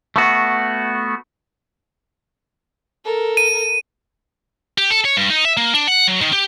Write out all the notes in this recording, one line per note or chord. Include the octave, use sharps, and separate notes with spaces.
A3 B3 F#4
A4 A#4
D#7
G4
A4
C#5
G2
D#4
E5
A#3
D4
F#5
F#3
D#3
G4